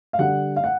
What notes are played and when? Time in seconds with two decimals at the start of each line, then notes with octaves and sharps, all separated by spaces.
0.13 F5
0.19 D3 G3 F#5
0.56 F5
0.64 F#5